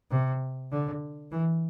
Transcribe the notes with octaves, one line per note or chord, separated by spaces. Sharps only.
C3
D3
E3